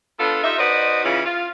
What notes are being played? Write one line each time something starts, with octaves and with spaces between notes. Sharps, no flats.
B3 D4 F4 A4
D#4 F4 G4 A4 E5
D#4 F#4 B4 C5 D5 D#5
C#3 E3 C#4 E4 F4
F4